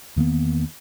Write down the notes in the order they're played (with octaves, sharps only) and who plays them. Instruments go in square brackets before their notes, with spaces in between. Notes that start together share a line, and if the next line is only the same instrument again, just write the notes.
[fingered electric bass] E2 D#3 A#3 B3